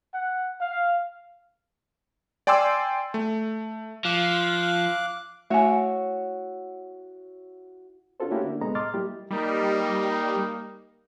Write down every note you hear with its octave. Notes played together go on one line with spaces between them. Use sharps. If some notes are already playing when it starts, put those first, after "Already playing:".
F#5
F5
D5 G5 G#5 C6 D6 E6
A3
F3 F5 D6 F#6
A3 E4 F#4 C#5 G#5
C#4 D4 F4 F#4 A4 C5
A3 A#3 C#4 E4 F#4 G4
D3 A#3 D4
C2 G#3 B3 A4 D#5 A#5
A2 D#5 C6 D6 F6 A6
F#3 G3 A#3 E4 G4
G3 A#3 D#4